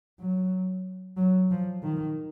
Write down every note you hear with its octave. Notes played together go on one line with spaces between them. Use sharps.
F#3
F#3
F3
D#3